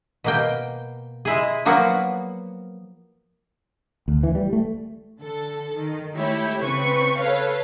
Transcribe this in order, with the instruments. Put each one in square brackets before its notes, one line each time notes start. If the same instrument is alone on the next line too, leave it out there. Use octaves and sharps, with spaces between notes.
[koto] B2 A#3 G5
G#3 E4 G#4
F3 F#3 A#3 B3 F#4
[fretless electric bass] D2
E3
G3
A3
[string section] D3 A4
D#3
G#3 A3 E4 G4 C#5
C#3 C4 B4 C#6
A4 B4 C#5 F5